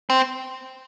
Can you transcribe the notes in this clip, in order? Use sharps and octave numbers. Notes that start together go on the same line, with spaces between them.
C4